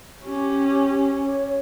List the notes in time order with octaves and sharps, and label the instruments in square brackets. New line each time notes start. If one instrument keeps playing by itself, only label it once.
[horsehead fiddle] C#4 [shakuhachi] G4
[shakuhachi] C#5